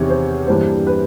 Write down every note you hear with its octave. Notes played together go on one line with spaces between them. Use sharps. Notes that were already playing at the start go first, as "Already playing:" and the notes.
Already playing: E2 C3 D#3 C#5
C5
G2 E3 G3 A#3 D4 C5
B4